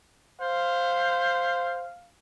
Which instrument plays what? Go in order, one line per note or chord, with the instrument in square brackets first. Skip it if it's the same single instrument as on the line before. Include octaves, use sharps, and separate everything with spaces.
[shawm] C5 [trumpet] F5